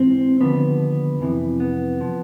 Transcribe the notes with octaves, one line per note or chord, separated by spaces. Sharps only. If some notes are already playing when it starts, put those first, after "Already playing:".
Already playing: G#2 E3 C4
D#2 D3 F3 B3
F2 C3 E3
B3
F3